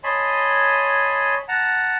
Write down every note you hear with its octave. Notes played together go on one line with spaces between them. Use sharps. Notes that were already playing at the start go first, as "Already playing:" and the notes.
C#5 D#5 G#5 A5 B5 C6
F#5 A5 A#5